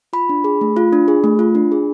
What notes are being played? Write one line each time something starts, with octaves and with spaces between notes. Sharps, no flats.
F4 B5
D4
G#4
A3
F4
D4
G#4
A3
F4
D4
G#4